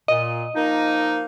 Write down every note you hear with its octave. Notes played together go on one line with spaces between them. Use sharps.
A#2 D#5
F3 A#3 D#4